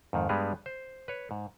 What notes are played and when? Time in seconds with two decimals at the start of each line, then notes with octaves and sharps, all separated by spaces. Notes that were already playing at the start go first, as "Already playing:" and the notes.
0.13 F2 G#2 D#3
0.29 G2 G3 G#3 B3 G#4
0.66 C5
1.08 B4 C#5
1.31 G#2